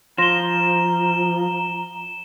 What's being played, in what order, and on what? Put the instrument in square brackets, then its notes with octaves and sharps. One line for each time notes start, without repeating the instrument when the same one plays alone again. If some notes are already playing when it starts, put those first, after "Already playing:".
[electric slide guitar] F3 [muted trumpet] A#5 [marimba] C6 A#6 [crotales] E7 G7